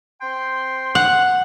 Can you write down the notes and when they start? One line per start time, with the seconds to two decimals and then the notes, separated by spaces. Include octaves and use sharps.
0.21 C4 G5 C6
0.95 F#5